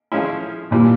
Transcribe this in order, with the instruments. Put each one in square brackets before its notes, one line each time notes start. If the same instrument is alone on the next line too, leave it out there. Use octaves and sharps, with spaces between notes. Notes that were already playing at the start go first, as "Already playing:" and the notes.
[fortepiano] F3 G#3 C#4 E4
[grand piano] A#2 [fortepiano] E3 G3